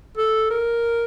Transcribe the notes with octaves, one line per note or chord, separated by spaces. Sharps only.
A4
A#4